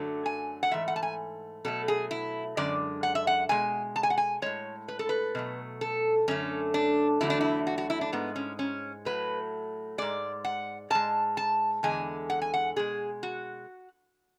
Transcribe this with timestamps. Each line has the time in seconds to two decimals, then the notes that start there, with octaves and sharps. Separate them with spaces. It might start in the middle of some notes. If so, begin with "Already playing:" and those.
Already playing: F#2 D3 F#3 A3
0.26 G#5
0.63 F#5
0.71 G#2 E3 A3 E5
0.88 F#5
0.96 A5
1.03 G#5
1.65 B2 F#3 A3 A4
1.88 G#4
2.11 E4
2.57 F#2 D3 G#3 D5
3.03 F#5
3.15 E5
3.27 F#5
3.49 B2 G#3 G#5
3.96 A5
4.03 G#5
4.10 F#5
4.18 G#5
4.42 A2 G#3 C#5
4.88 B4
4.99 A4
5.09 B4
5.35 B2 F#3 A3
5.81 A4
6.28 F#2 D3 A3 C#4
6.74 D4
7.20 E2 D3 F#3 A3 E4
7.30 D4
7.41 E4
7.67 F#4
7.78 F#4
7.90 E4
8.01 D4
8.12 G#2 G#3 B3
8.36 C#4
8.59 C#4
9.05 A2 F#3 A3 B4
9.98 G#2 G#3 D5
10.45 F#5
10.90 G#2 G#3 A5
11.37 A5
11.83 E2 D3 G#3 G#5
12.30 F#5
12.42 G#5
12.54 F#5
12.76 B2 G#3 G#4
13.23 F#4